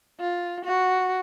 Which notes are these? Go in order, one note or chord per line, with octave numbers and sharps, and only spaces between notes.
F4
F#4